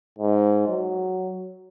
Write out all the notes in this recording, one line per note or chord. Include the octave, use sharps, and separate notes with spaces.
G#2
F#3